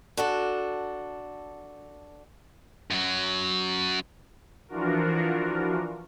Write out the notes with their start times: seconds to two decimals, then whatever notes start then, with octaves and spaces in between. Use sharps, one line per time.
0.17 D4 F#4 A4
2.91 F#2 F#3
4.69 E3 F3 D4 F4 F#4 A#4